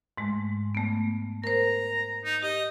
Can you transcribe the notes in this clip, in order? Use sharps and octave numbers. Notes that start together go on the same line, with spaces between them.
G#2 G#3 A3
A3 B3
A#4 C5 A#5
D#4
G4 D#5